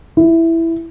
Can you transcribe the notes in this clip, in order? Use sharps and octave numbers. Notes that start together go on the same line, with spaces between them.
E4